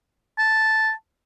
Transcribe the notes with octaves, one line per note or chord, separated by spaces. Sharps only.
A5